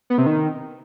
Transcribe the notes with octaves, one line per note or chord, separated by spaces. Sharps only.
B3
C3
D#3